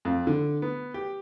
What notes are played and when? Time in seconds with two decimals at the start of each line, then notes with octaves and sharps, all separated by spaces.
0.05 F2
0.27 D3
0.62 B3
0.94 G4